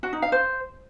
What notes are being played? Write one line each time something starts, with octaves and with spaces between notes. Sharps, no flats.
F#4
D#4
F5
C5